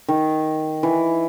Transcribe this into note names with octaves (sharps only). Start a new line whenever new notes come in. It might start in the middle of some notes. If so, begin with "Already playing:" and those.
D#3
E3